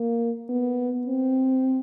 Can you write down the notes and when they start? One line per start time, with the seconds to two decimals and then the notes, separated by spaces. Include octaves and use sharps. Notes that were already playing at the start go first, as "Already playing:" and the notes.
Already playing: A#3
0.49 B3
1.07 C4